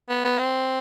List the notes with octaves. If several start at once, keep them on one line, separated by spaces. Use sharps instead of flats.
B3
B3
C4